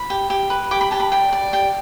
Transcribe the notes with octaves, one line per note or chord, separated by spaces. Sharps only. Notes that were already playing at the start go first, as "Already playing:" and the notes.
Already playing: B5
G4
G4
B4
G4 D6
B5
G4 A5
B5
D5 G5
D5
G4 G5